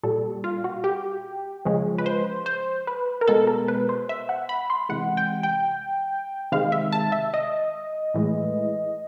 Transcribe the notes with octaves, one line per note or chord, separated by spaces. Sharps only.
A#2 G3 A4
F4
F#4
G4
C#3 F3 G#3
B4
C5
C5
B4
A#4
B2 G#3 A4
A#4
B4
C5
E5
F#5
B5
C6
C3 E3 G#3 F#5
G5
G5
C3 D#3 G#3 F5
E5
A5
E5
D#5
A2 E3 G#3